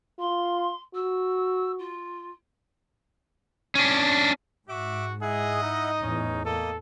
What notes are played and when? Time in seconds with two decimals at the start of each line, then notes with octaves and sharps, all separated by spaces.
0.19 F4 C6
0.95 F#4 E6
1.79 F4
3.75 C#4 D4
4.69 G#2 F#4 E5 D6
5.22 E4 G#4 D#5 F#5
5.63 D#4
6.02 E2 A2 C#4
6.45 A#3 A4 D#5